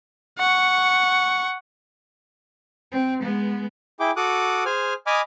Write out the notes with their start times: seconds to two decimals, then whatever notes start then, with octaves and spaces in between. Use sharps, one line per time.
0.39 F#5 C#6
2.92 C4
3.23 G#3 B3
4.00 E4 G#4 G5 D6
4.16 F#4 A4 D6 D#6 F#6
4.66 G#4 C5 G#5 F6
5.07 D#5 G#5 B5 D6 D#6 F6